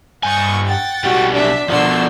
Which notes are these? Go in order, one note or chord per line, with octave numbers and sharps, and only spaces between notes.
G2 F#5 G#5 C#6 D#6
F#5 G5 A6
B1 G3 F#4
D4 E5
B2 D3 F3 C6 C#6 E6